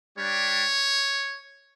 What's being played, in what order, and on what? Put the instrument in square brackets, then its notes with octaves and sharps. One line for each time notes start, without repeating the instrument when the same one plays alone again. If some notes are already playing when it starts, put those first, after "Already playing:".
[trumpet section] G3 D4 G4 C#5